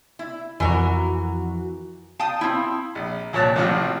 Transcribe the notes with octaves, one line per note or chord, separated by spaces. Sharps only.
E4
F2 E3 F#4 A#4
F5 G5 A5 D#6
C4 E4
A#1
C2 A#2 C#5 A5 F#6
A1 A2 C3 F3 F#3 F6